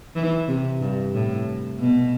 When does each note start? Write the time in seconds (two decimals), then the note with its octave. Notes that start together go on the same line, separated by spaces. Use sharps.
0.16 E3
0.48 C3
0.81 G2
1.14 A2
1.79 B2